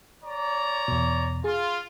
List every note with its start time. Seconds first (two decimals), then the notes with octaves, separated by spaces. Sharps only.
0.24 C#5 D5 A#5
0.88 E2 B2
1.44 F4 G#4